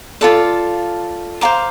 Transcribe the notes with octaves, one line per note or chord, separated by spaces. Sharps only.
F4 A4 D5 F5
C5 F5 A#5 D6